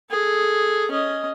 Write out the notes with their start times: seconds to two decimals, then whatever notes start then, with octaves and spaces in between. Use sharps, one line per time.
0.10 G#4 A4
0.91 C#4 D#5